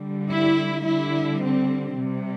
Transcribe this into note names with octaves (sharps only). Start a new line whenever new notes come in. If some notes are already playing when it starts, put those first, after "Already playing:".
Already playing: D3 G3
E4
D3 G3 E4
C4
C3 G3